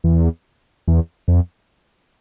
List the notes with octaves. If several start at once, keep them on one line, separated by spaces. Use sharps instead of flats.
E2
E2
F2